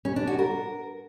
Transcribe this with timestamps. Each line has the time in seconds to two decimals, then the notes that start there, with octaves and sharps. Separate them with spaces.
0.05 C#4
0.16 D4
0.27 F#4
0.39 A#4